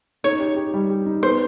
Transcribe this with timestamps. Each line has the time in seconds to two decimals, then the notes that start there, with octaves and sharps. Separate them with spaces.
0.24 D#4 C#5
0.40 G4
0.56 G4
0.74 G3
0.90 G4
1.06 D#4
1.23 B3 C5